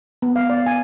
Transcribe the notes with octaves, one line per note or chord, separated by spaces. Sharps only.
B3
F5
D5
G#5